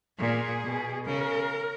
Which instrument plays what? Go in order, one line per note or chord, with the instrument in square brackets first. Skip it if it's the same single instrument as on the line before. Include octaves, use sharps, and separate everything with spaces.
[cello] A#2 [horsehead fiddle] G#4
[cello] B2
[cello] C#3 [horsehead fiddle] A#4